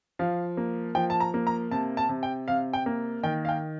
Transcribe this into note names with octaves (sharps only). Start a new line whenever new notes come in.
F3 F5
A#3
F3 G5
A5
A#5
A#3
A#5
C3 A5
A5
C3
G5
C3 F5
G5
A#3
D#3 G5
F5
G5